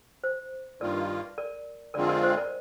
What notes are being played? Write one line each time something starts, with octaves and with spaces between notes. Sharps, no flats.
C5
G2 D#3 A#3 F4 A#4 D5
A#4 D5
F2 D3 G#3 C4 F4 A#4 D5
A#4 D5
C5 D#5
A#4 D5